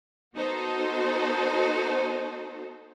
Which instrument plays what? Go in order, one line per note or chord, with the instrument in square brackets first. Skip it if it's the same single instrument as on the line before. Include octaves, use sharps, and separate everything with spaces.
[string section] B3 D#4 F#4 A4 C5